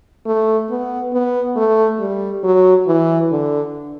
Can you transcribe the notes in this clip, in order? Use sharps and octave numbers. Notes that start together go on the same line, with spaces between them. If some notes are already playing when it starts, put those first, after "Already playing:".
A3
B3
B3
A3
G3
F#3
E3
D3